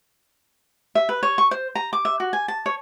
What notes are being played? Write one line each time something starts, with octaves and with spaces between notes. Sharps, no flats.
E5
B4
C#5
C#6
C5
A#5
D6
E5
F#4
G#5
A5
C#5